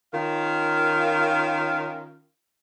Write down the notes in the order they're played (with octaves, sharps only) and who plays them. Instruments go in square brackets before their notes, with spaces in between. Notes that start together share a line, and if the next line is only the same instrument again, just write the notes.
[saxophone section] D#3 C#4 F4 A#4 F5